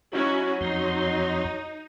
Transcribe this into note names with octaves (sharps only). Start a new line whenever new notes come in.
F#3 C#4 D#4 E4 F#4
F2 D#4 C6